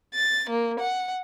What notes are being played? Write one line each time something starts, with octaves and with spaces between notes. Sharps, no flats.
A6
A#3
F#5